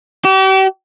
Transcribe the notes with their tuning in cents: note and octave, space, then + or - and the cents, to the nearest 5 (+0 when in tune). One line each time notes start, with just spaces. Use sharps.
G4 -40